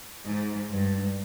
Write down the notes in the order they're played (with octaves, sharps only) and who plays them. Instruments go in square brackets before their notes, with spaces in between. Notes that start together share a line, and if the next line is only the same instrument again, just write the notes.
[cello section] G#2
G2